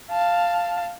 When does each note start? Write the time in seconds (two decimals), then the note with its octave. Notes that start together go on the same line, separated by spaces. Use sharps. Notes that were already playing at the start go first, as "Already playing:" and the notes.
0.11 F5 A5